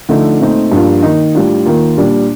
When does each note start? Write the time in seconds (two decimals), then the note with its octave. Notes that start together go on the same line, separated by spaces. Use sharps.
0.09 D3 F3 A3 D#4
0.40 A#2 A3 C4 D#4
0.72 G2 F3 A#3 D4 F4
1.03 D#3 A#3 D#4
1.35 A2 G3 D4 F4
1.66 D#3 A#3 F4
1.98 A#2 G3 D4